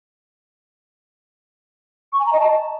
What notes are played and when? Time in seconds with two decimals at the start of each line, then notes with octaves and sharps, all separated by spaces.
2.13 C#6
2.19 G#5
2.26 A#5
2.33 D#5
2.39 A5